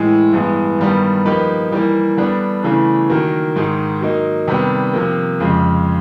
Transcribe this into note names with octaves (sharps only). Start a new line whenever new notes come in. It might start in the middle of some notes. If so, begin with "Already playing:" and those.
Already playing: A2 E3 G#3
G2 E3 G#3 B3
G2 D#3 G3 B3
F3 A#3 D#4 G4 B4
E3 G3 A#3
D3 G3 B3 D4
C#3 E3 A3 D4
D#3 F#3 A#3
G#2 D#3 G#3
F#3 A#3 D#4
C3 D#3 G3 B3 D4
C3 F3 A#3
F2 C#3 F3 G#3